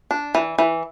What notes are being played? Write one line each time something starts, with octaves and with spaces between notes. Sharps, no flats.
D4
E3
E3